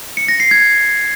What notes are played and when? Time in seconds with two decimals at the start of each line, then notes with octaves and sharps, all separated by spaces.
0.17 C#7
0.28 A#6
0.40 C7
0.51 G#6